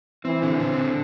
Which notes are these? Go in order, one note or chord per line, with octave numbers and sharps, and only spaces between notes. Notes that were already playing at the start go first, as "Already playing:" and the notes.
E3 C4
D3
C4
D3